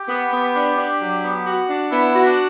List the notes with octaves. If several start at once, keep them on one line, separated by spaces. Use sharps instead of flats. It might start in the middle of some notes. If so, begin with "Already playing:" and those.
Already playing: G4
B3
B3
D4
D4
F#3
B3
F#4
D4
B3 E4
F#4
D4